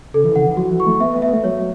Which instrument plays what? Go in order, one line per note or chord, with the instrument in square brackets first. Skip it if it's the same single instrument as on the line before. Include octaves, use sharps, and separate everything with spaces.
[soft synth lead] C#3 [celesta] A4
[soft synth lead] E3
[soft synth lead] C#3 [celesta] F#5
[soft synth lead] E3
[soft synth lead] F#3 [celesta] F#4
[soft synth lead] E3
[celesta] C#6
[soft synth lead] A3
[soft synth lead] B3 [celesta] E5
[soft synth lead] B3
[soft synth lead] B3 [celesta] E5
[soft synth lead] A3
[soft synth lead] F#3 [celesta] C#5
[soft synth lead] F#3